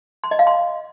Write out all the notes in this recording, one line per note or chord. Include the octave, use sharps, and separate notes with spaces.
C6
D#5
F5
C6